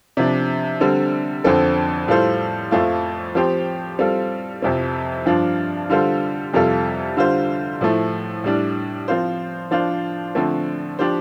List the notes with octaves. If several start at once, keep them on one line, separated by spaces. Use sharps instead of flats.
C3 F3 D4
D3 G3 C4 A4
F2 D3 F3 C4 A4
A2 G3 F4 A4 C5
F2 F3 A3 F4
F3 C4 G4 C5
G3 C4 F4 A4
F2 C3 F3 C4
G2 F3 D4 F4
D3 G3 F4 A4 C5
F2 C3 G3 F4 A4
D3 G3 F4 C5
A2 F3 A3
A2 G3 D4
F3 C4 F4 C5
F3 D4 F4 C5
D3 F3 A3 C4
F3 D4 G4 C5